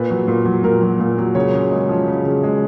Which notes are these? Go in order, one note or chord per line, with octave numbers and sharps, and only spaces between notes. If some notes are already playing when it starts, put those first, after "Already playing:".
Already playing: A#2 B4
F#3
A#2
F#3
A#2 A#4
F#3
A#2
F#3
C#3 C#5
C#3
G#3
F3
C#3
C#3
G#3